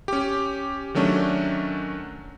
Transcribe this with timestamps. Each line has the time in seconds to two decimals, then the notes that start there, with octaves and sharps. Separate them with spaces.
0.08 C#4 G4
0.95 D#3 F#3 A3 C#4 D4